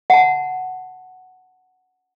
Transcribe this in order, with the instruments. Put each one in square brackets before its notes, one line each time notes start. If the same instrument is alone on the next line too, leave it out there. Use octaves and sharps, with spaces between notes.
[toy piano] F#5 A5